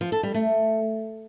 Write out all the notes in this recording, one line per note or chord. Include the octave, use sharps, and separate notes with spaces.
F3
A4
G3
A3